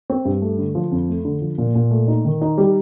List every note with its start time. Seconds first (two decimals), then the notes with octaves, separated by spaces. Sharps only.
0.10 C4
0.25 G2
0.42 A3
0.59 D3
0.75 F3
0.91 F2
1.09 A3
1.25 D3
1.41 F3
1.58 A#2
1.75 A#2
1.91 A3
2.08 D#4
2.25 D#3
2.41 D#4
2.58 G3